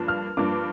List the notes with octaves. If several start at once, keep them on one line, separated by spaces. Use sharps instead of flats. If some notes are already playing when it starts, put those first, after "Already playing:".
Already playing: G2 F3 A#3 D4
F6
G2 F3 A#3 D4 D6